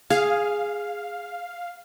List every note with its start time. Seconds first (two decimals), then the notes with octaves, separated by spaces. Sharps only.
0.10 G#4 F5